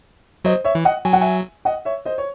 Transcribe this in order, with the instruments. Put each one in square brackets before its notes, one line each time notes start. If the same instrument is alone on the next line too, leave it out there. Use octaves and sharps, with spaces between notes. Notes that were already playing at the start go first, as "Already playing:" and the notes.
[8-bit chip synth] F#3 [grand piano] C5 D#5
[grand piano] C#5 E5
[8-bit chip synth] E3
[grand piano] D#5 F#5
[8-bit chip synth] F#3 [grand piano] G#5
[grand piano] F#5
E5 G#5
D#5 F#5
C#5 E5
C5 D#5
C#5